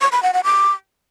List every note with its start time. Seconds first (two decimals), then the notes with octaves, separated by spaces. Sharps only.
0.01 C#6
0.12 B5
0.23 F#5
0.33 F#5
0.44 D6